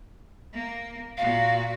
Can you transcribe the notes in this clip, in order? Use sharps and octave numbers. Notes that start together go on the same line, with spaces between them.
A#3
A#2 F#4 F5